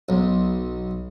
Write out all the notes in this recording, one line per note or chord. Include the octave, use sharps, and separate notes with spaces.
B1